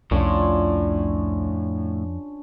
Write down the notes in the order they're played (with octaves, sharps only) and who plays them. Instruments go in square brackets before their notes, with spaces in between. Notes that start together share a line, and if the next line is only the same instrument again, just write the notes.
[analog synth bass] C2 [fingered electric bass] F2 [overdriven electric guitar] A2 [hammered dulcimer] C#4 D4 F4